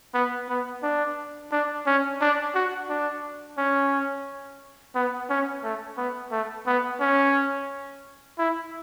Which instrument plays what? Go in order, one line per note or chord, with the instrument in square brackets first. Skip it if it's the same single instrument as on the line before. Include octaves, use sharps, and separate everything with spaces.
[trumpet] B3
B3
D4
D4
C#4
D4
F#4
D4
C#4
B3
C#4
A3
B3
A3
B3
C#4
E4